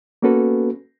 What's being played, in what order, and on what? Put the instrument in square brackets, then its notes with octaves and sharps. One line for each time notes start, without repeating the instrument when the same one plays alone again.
[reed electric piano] A#3 B3 C#4 F#4 A4 B4